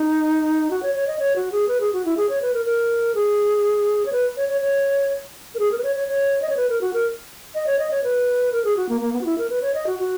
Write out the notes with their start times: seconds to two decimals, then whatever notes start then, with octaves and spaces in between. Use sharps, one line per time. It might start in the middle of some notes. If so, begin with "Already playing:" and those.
Already playing: D#4
0.71 F#4
0.83 C#5
0.95 C#5
1.07 D#5
1.19 C#5
1.36 F#4
1.52 G#4
1.68 B4
1.80 G#4
1.93 F#4
2.05 E4
2.17 G#4
2.29 C#5
2.42 B4
2.54 A#4
2.66 A#4
3.15 G#4
4.06 C#5
4.12 B4
4.37 C#5
4.49 C#5
4.61 C#5
5.55 A#4
5.59 G#4
5.71 A#4
5.78 B4
5.84 C#5
5.96 C#5
6.08 C#5
6.42 D#5
6.49 C#5
6.57 B4
6.69 A#4
6.81 F#4
6.93 A#4
7.55 D#5
7.66 C#5
7.79 D#5
7.91 C#5
8.04 B4
8.52 A#4
8.65 G#4
8.76 F#4
8.89 A#3
9.01 A#3
9.13 B3
9.21 F#4
9.26 E4
9.38 A#4
9.50 B4
9.62 C#5
9.74 D#5
9.87 F#4
9.99 F#4